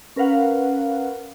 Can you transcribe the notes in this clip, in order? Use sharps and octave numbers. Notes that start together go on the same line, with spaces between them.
C#4 A#4 B4 F5 F#5